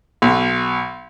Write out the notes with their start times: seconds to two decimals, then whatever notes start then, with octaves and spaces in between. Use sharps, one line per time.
0.22 B1